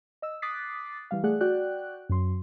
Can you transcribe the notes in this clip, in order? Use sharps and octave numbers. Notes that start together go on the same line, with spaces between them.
D#5 E6
D6 D#6 F#6 A6 B6 C7
E3 G3 F5
A3 G#4 D5 F#5 F#6
F#4 D5 G5 F#6
F#2 F#3 C6